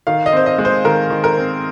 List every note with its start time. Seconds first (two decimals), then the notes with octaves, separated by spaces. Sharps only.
0.07 D#3 F5
0.26 D#5
0.33 C4 C5
0.46 D#5
0.58 G#3
0.65 C5
0.85 D#3 A#4
1.10 D#3
1.24 A#4
1.37 C4